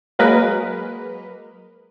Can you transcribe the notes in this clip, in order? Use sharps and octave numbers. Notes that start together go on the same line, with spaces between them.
F#3 G#3 A#3 A#4 B4 D#5